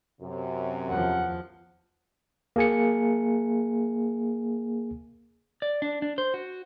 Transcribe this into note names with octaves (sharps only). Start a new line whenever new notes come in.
F#2 C3
E2 F3 F#5
A#3 G#4 G#5 C#7
D5
D4
D4
C5
F#4